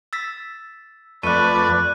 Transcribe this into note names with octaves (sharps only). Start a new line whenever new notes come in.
E6 A6 B6
F2 A3 B4 D5 C#6 F#6 D#7